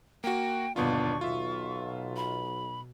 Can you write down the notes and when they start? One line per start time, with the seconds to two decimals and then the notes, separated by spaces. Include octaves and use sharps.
0.24 A#3 F#4 G5
0.76 G1 D#2 B2 B3 D4 F4 C#6
1.21 B1 B2 F4 E5
2.16 B5